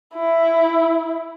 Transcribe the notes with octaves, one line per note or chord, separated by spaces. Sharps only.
E4